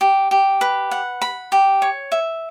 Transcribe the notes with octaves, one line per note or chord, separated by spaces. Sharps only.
G4
G4
B4
F#5
B5
G4
C#5
E5